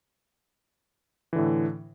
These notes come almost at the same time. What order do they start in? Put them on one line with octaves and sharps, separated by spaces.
E3 D3 A2